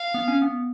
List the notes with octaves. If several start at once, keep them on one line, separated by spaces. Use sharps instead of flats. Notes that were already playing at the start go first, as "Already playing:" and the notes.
Already playing: F5
B3
C#4
B3